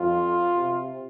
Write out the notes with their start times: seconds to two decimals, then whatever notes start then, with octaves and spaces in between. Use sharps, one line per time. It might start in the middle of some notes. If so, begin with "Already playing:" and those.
Already playing: F2 F4
0.55 C3